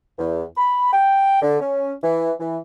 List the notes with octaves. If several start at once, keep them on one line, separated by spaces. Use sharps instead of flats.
E2
B5
G5
D3
C#4
E3
E3